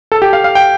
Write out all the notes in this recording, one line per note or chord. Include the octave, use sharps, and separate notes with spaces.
A4
G4
F5
F5
G5